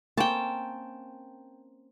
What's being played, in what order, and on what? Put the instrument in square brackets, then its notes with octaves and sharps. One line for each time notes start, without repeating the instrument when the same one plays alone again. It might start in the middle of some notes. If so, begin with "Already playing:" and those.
[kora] A#3 C4 C#4 [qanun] G5 A5